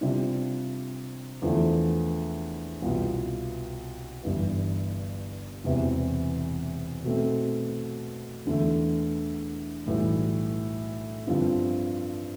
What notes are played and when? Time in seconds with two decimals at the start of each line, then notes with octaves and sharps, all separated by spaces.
0.01 C3 G3 D4 F4
1.42 E2 D3 F3 A3
2.82 C2 B2 B3 F4
4.23 G1 G2 E3
5.64 E1 E2 C3 E3
7.04 B2 A3 C4
8.45 E2 D3 A3
9.86 B1 A2 E3 G3 D4
11.27 G2 D3 F3 C4 F4